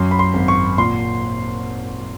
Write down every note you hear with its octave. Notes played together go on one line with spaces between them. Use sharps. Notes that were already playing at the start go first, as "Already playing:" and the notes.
Already playing: F#2 F#3 C6
B5
C6
G#1
C#6
A#2 C6